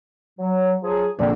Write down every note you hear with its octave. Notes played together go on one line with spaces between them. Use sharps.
F#3
F3 F#3 G#4
A#1 D3 C4 D5